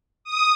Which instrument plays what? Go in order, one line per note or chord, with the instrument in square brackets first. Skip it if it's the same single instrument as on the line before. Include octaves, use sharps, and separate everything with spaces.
[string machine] D#6